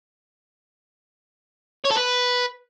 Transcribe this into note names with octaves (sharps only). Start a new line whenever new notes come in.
C#5
A4
B4